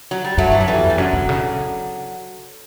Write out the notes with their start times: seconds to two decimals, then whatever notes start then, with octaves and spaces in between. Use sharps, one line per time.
0.11 F#3
0.25 G3
0.37 G2 F#3 A3
0.52 E3
0.58 F#2 F#3
0.67 E3 G3
0.78 E2
0.90 G3
0.98 F#2 D3 F#3
1.13 B2
1.29 C#3